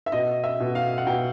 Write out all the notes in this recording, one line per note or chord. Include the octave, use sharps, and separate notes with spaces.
E5
B2 D#5
E5
B2
F5
F#5
B2 G5